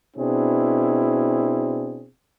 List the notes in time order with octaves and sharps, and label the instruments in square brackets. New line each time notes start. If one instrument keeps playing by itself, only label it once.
[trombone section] B2 C4 D4 E4 G#4